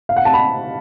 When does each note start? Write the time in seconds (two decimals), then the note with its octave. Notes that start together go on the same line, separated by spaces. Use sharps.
0.09 F5
0.17 F#5
0.25 A5
0.34 B5